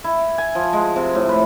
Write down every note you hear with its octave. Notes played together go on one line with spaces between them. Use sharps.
E4
G#5
F3
G#3
C3
A2
B4